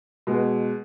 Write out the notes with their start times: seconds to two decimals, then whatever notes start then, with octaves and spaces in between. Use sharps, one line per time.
0.27 B2 G#3